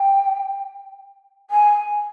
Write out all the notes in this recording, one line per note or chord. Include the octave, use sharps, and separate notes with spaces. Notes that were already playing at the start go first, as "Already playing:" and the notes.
Already playing: G5
G#5